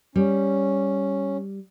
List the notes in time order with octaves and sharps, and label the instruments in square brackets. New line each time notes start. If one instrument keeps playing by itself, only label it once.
[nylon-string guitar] G3 [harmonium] C#4